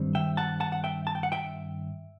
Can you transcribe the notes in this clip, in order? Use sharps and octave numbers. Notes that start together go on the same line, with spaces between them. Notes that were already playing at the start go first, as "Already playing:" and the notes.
Already playing: G2 D#3 G3 C4
E5 G5
F#5 A5
F#5 A5
F#5
E5 G5
A5
G5
F#5
E5 G5